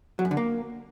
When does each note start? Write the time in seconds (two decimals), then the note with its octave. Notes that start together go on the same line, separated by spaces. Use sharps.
0.19 F#3
0.25 F#2
0.31 D3
0.37 A#3